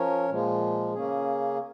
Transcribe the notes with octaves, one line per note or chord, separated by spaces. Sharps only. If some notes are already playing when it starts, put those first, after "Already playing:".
Already playing: F3 C#4 A#4 C#5
A#2 F3 G#3
C#3 A#3 C#4 G#4